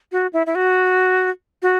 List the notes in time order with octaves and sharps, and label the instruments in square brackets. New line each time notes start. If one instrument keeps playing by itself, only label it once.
[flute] F#4
E4
E4
F#4
F#4